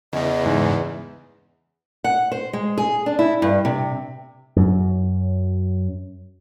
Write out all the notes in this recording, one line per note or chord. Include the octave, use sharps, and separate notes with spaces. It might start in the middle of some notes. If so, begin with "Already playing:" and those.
E2 C#3 E3 D#5
G#2
F#5
C5
G#3
G#4
D4
E4
G2
C3
F#2 F#3